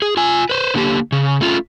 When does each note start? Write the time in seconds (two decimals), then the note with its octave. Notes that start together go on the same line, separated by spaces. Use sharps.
0.02 G#4
0.17 F4 G#5
0.50 B4 C5
0.74 D3 A#3 G4
1.12 C#3
1.41 A3 C#4 F4